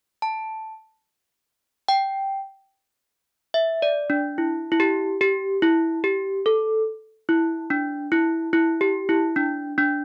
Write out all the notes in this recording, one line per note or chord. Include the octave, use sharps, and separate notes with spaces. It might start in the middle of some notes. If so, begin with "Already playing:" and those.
A5
G5
E5
D5
D4
E4
E4
G4
G4
E4
G4
A4
E4
D4
E4
E4
G4
E4
D4
D4